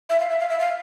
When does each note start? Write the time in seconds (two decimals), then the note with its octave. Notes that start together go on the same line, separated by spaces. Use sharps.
0.09 E5
0.20 F5
0.30 E5
0.40 F5
0.50 E5
0.60 F5